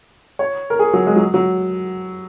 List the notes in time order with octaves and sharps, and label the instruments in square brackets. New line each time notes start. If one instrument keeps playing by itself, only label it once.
[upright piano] C#5
A#4
G#4
F#3
G#3
F#3
F#3